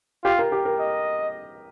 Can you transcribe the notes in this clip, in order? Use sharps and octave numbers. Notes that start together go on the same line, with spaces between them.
F4 G4
A#4
G4
A#4
D#5